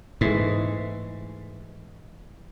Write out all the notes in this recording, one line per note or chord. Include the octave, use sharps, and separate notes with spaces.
G#2 E3 G#3 A3